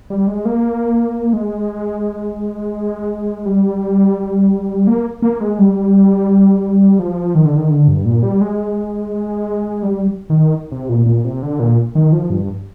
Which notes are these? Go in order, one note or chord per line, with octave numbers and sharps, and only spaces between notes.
G3
G#3
A#3
G#3
G3
A#3
A#3
G#3
G3
F3
D#3
D3
D#3
D3
G2
A#2
G3
G#3
G3
D#3
C3
A#2
A#2
C3
D3
A#2
D#3
F3
G2